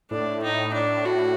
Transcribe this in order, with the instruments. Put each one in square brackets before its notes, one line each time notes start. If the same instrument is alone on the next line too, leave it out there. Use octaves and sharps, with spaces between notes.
[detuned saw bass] A2 [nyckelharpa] D4
[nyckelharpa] D#4
D4
F#4